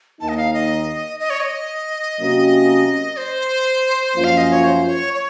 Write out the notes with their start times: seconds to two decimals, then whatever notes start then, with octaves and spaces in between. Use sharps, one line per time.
0.20 D#2 D#3 A#3 D#4 A5
0.29 D#5
0.37 F5
0.53 D#5
1.20 D#5
1.30 C#5
1.40 D#5
2.18 C3 F#3 A#3 C#4 F#4
3.17 C5
4.15 F#2 F3 A#3 C#4 F4
4.24 F5
4.37 D#5
4.51 C#5
4.64 C5
4.89 C#5
5.14 C#5